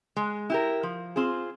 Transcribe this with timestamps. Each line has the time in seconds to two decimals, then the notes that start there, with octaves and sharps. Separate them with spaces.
0.16 G#3
0.50 E4 G4 A#4
0.83 F3
1.16 C4 F4 G#4